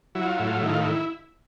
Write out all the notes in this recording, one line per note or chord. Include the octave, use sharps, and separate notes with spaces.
F#3 E4
F4
A2 E4
F4
D#3 E4
F4
E4